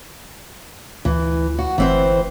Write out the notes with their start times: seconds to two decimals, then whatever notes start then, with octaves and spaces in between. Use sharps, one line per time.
1.05 D2 E3
1.58 F#4
1.78 G1 E3 C4 C5